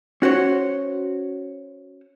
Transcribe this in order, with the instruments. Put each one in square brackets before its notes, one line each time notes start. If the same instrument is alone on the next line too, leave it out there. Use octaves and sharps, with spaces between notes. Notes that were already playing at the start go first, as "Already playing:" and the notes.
[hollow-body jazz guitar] C#4 F#4 C5 C#5